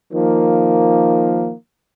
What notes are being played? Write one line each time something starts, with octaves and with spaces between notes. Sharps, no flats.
D#3 F3 A#3